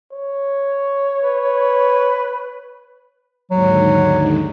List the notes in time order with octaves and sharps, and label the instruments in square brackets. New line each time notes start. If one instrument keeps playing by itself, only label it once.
[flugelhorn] C#5
[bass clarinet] B4
[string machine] D#2 G#2 D3 [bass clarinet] F#3